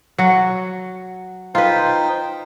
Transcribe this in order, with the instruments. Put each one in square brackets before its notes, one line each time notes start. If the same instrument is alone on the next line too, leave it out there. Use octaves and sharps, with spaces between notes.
[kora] F#3 F#4
[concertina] D#4 C5 G5 [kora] F4 B4